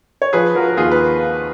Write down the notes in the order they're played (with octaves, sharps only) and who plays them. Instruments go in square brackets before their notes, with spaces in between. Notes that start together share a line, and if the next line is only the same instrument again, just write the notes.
[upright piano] C#5
[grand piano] F3 [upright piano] G#4 B4
[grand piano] F3 [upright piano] F#4 A#4
[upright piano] A#4
[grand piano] D#2 [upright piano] F4 G#4
[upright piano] B4